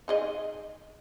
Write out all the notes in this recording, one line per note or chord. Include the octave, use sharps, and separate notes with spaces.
D#4 G#4 D#5